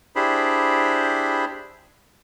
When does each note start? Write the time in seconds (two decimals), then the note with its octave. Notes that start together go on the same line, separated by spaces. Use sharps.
0.16 D4 E4 G4 G#4 C5 B5